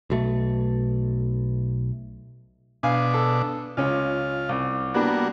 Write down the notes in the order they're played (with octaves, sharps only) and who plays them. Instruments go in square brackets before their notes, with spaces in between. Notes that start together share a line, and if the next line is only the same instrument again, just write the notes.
[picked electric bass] B1 B2 A3
[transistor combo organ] B2 D4 [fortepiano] F5 G#5
[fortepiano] A4
[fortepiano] C#2 C#4 [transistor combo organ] F4
[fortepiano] C2
[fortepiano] G3 B3 D4 [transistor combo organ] A#3 F#4